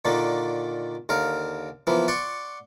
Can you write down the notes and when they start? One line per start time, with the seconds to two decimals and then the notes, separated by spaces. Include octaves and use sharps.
0.05 A#2 D3 D#3 A#3 D4
1.09 D#2 D3 A#4 F5
1.87 E3 F3 A#3 B3
2.08 D5 F#5 C6 C#6